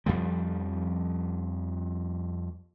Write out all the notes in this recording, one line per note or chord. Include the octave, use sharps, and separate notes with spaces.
F2 F3 G3